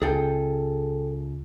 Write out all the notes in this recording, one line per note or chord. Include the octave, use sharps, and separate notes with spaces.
C#2 G#4 A4 G5